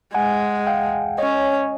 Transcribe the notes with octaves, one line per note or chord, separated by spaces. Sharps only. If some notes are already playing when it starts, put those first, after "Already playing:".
G#3 F#5 G#5
F5 G5
C#4 C#5 D#5